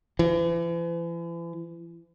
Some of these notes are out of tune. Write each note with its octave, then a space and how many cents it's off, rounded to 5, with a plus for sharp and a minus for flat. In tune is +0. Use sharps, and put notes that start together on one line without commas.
E3 +40